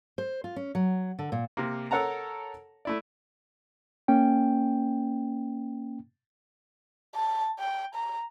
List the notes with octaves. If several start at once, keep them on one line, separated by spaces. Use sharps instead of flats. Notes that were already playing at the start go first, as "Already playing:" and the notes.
C5
F4
C#4
F#3
D3
A#2
C3 A#3
A4 A#4 C#5 F#5 A5 A#5
A3 E4 D5
A#3 C#4 G5
A5
G5
A#5